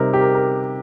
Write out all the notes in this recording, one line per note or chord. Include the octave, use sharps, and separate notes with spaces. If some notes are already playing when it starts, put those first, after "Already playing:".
Already playing: C3 G3 D#4 A#4
G4
A#4
A#4